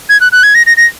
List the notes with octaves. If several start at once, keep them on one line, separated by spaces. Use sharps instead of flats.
G#6
F#6
F#6
G#6
A#6
A#6
A#6